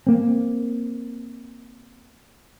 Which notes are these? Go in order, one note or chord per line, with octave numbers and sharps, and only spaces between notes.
A#3 C4